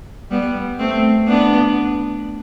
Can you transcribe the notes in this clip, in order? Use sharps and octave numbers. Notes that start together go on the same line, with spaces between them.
G3 B3
A3 C4
B3 D4